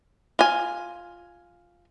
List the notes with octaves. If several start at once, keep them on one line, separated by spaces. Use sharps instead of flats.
F4 G#5